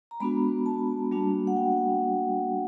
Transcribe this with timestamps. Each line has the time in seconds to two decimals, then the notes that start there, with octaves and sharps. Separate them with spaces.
0.11 A#5
0.20 G#3 B3 D4 F#4 B5
0.66 A5
1.11 G3 A#3 D4 F#4
1.47 F#5
1.57 G5